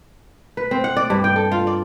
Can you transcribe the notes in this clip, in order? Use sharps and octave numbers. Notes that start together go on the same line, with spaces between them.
B4
C4
F#5
D5
G2
G5
A4
F4
D5